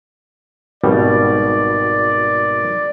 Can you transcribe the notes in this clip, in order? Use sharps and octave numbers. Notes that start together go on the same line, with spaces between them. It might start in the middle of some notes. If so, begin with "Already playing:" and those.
G#1 B2 G3 D5